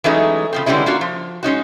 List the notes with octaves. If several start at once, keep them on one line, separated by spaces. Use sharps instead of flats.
E3 F#3 G#3 A3 C#4 D#4
C#3 F3 C4
D3 E3 G3 G#3 C#4 E4
A#3 D4 F4 F#4
F3
G#3 C#4 D#4 F#4